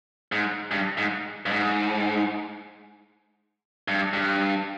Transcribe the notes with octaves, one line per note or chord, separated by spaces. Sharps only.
G#2
G2
G#2
G2
G#2
G2
G2